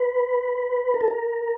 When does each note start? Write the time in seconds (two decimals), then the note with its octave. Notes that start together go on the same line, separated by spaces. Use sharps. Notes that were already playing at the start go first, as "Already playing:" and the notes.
Already playing: B4
0.94 A#4
1.01 A4
1.08 A#4